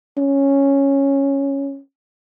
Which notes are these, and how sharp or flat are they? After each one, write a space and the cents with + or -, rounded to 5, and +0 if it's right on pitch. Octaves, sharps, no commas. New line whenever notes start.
C#4 -5